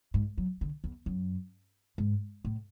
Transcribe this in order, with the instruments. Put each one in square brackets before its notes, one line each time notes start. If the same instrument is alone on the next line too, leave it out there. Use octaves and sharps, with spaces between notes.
[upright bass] G#2
F#3
D3
E2
F#2
G#2
A2